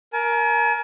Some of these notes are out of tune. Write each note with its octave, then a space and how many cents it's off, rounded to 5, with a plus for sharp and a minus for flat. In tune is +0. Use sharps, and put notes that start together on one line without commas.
A#4 +10 G#5 +45